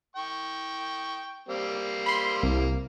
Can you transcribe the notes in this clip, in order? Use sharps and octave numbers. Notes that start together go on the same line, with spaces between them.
G5 C#6
G3 A#3 C4
B5 C6
C2